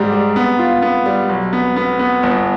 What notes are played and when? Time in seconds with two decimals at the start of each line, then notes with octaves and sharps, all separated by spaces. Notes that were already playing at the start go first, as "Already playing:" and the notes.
Already playing: G#2 G3 G4
0.12 G3
0.36 B3
0.59 F4
0.82 B3
1.06 G3
1.29 B1
1.53 B3
1.76 B3
1.99 B3
2.23 G1